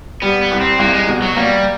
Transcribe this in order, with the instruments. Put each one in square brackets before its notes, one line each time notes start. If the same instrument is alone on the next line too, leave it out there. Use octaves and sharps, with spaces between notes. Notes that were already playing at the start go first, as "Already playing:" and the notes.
[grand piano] G3 [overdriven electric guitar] B3
[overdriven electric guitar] B3
[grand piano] C2
[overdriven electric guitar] C4
[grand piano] C2 [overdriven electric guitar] A#3
[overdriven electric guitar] G#3
[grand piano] B2
[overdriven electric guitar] F#3
[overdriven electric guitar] G3 [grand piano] A#3